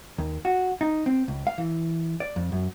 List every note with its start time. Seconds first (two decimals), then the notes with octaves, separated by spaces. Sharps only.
0.18 D#2
0.45 F#4
0.81 D#4
1.06 C4
1.28 C#2
1.47 F5
1.58 E3
2.20 D5
2.36 F2
2.52 F#2